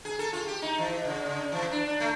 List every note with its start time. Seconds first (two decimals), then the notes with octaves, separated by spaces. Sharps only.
0.05 G#4
0.19 A4
0.33 F4
0.47 G4
0.62 D#4
0.78 E3
1.05 C#3
1.26 C#3
1.52 E3
1.71 D4
1.87 D4
2.00 A3